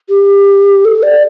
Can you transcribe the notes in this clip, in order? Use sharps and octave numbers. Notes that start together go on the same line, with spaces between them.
G4
A4
D5